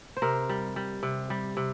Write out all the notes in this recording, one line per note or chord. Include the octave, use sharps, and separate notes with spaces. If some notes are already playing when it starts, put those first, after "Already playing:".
C5
C3 A#4
G3
G3
C3
G3
C3